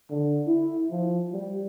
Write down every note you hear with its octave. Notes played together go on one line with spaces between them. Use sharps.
D3
E4
F3
G3